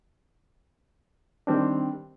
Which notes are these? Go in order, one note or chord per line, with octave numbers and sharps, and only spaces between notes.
D#3 G3 C4 D4